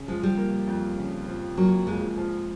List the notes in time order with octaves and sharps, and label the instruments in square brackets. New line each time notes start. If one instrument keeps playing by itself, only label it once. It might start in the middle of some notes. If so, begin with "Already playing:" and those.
Already playing: [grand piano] C#3
[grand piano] F3 [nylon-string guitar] G#3
[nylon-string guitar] G3
[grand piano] A#3
F2
C#3
F3
[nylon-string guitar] F#3 [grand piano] A#3
[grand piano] F2 [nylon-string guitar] G#3
[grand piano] F3